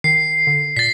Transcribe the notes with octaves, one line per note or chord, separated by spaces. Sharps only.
D#3 C7
D3
A#2 A6 B6